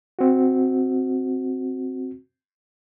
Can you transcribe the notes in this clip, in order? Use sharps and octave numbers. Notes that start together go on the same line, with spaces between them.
C4 F#4